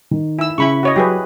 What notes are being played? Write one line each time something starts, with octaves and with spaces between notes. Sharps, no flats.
D#3
E4 E6
C#3 E4 B5 C#6
F#4 C#5 D#5
F#3 G4 G#4 B4